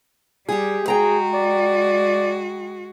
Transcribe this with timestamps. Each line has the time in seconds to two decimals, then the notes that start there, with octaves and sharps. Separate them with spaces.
0.49 G3 G4 G#4
0.88 G#3 F#4 G#4 G5 A#5
1.35 D5